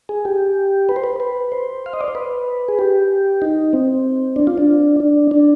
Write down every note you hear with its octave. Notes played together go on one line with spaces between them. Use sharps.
G#4
G4
B4
C5
B4
B4
C5
F5
D#5
D5
C5
B4
G#4
G4
D#4
C4
D4
F4
D4
D4
D4